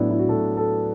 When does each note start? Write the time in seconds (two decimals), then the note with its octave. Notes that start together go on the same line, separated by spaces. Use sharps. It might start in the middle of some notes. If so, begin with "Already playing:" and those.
Already playing: A2 F#3 B3 D4 E4
0.10 E4
0.19 F#4
0.28 A2 F#3 A4
0.57 A4